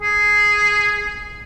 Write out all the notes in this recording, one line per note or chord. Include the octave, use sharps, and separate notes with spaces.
G#4